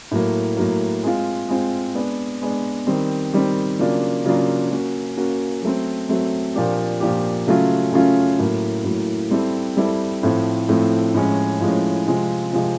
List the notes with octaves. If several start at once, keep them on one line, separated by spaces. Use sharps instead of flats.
A2 F#3 A#3
A2 F#3 A#3
G#3 C4 F4
G#3 C4 F4
G#3 B3 D4
G#3 B3 D4
D#3 G3 C4
D#3 G3 C4
C#3 F#3 A#3 D4 F4
C#3 F#3 A#3 D4 F4
A#3 C#4 F#4
A#3 C#4 F#4
F#3 A3 C4
F#3 A3 C4
A#2 F3 A#3 D4 G4
A#2 F3 A#3 D4 G4
C#3 F#3 A3 C#4 F4
C#3 F#3 A3 C#4 F4
A2 F#3 A#3
A2 F#3 A#3
G3 C4 E4 A4
G3 C4 E4 A4
A2 F3 A3 C4
A2 F3 A3 C4
A2 F3 G#3 C#4
A2 F3 G#3 C#4
C3 F3 G#3 C4 F4
C3 F3 G#3 C4 F4